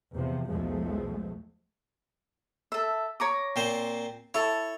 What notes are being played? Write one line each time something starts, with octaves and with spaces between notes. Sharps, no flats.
E2 C3 F3
B1 E2 F3 G#3 A3
A4 E5
C#5 A#5 D6
A#2 C4 C5
E4 A4 C#5 A5